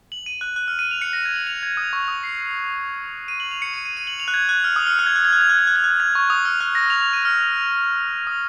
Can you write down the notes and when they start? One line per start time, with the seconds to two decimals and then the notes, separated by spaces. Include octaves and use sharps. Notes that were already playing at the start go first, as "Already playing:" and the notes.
0.12 F#7
0.26 D#7
0.41 F#6
0.56 F#6
0.68 F6
0.79 D#7
0.91 F7
1.02 C#7
1.13 A#6
1.25 G#6
1.36 F#7
1.47 F7
1.63 G#6
1.77 D#6
1.93 C#6
2.08 D#6
2.23 C7
3.28 D#7
3.40 F#7
3.51 F7
3.62 C#7
3.74 D#7
3.85 D#7
3.97 D#7
4.07 F#7
4.20 F7
4.28 F#6
4.34 G#6
4.49 F#6
4.64 F6
4.76 D#6
4.87 F6
4.99 F#6
5.06 G#6
5.16 F#6
5.25 G#6
5.33 F#6
5.41 G#6
5.49 F#6
5.59 G#6
5.67 F#6
5.76 G#6
5.84 F#6
6.00 G#6
6.15 C#6
6.30 D#6
6.45 F6
6.61 F#6
6.75 A#6
6.90 F7
7.01 F7
7.13 D#7
7.25 F6
8.27 D#6